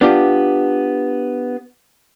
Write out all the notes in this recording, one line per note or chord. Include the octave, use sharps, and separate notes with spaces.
B3 D4 F4 G4